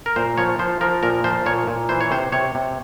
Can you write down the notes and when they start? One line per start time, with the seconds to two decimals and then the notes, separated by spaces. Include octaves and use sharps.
0.06 A#4
0.16 A#2 C5
0.37 F3 C#5
0.59 F3 C5
0.81 F3 A#4
1.03 A#2 A#4
1.24 F3 C5
1.46 A#2 C#5
1.67 A#2
1.89 E3 C5
2.01 C#5
2.11 C3 C5
2.32 C3 C#5
2.55 C3